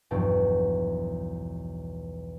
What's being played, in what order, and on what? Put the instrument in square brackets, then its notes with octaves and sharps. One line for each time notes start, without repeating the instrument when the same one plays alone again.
[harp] B1 E2 G2 F3 G5 A5